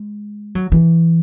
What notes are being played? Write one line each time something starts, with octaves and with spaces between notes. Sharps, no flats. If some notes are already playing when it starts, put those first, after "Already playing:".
Already playing: G#3
F#3
E3